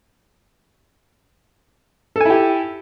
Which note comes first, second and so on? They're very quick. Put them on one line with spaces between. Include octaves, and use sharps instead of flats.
A4 G#5 E4 G4